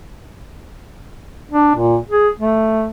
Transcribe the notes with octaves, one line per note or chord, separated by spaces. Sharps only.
D4
A#2
G#4
A3